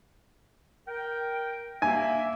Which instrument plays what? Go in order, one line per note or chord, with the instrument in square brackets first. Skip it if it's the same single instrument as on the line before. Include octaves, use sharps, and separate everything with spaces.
[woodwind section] A#4 G5
[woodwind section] A#3 E5 [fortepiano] G#5